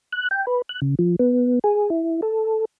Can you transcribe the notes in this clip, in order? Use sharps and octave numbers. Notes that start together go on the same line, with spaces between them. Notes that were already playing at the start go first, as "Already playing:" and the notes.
F#6
G5
B4
F#6
C#3
F3
B3
G#4
E4
A4